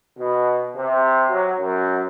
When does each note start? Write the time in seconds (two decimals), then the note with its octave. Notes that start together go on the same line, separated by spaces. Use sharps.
0.18 B2
0.75 C3
1.29 F#3
1.60 F#2